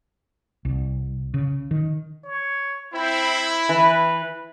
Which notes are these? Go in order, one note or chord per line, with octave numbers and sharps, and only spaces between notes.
C2
C#3
D#3
C#5
C4 E4
E3 B4